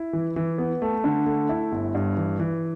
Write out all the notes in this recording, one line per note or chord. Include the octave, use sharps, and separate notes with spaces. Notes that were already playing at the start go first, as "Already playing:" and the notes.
Already playing: E4
E3
E3
B3
A3
D3
A3
E4
G1
G2
E3
E3